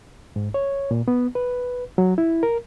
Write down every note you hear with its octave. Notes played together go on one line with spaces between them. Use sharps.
G#2
C#5
A#2
B3
B4
F#3
E4
A#4